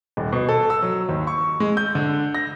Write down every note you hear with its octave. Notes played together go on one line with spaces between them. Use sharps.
D#1
B2
A4
E6
F#3
D#2
C#6
G#3
G6
D3
A#6